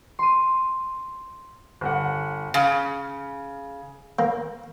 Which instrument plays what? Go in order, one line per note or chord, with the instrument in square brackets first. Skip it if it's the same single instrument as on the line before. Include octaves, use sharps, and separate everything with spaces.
[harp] C6 D#7
[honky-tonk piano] G1 F#5
[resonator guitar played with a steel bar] C#3
[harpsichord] A#3